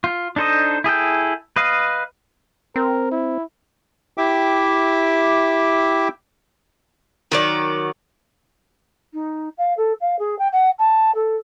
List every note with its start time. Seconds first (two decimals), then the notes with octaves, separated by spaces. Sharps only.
0.04 F4
0.36 D4 D#4 A4 C5 D#5
0.84 E4 G#4 A4 G5
1.56 B4 D#5 F5
2.76 C4 A#4
3.11 E4
4.17 E4 G4 E5 G5 D6
7.32 D#3 F#3 D5
9.13 D#4
9.57 F5
9.77 A4
10.00 F5
10.19 G#4
10.38 G5
10.52 F#5
10.79 A5
11.15 A4